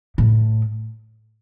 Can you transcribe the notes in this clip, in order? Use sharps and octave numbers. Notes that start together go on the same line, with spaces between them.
A2